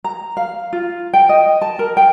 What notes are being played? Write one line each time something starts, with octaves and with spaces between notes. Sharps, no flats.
A#5
F5
F4
G5
D#5
A5
A#4
G5